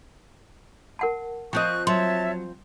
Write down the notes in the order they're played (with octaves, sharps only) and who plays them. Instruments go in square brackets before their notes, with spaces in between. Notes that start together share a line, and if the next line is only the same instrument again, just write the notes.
[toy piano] A#4 F#5 A5
[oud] F3 C4 D#5 [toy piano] G5 [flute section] C#6 F#6
[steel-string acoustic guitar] F#3 [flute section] C#5 E5 A5 [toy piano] C6